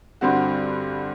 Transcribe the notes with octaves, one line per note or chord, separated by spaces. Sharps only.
G2 D3 G3 C4 F#4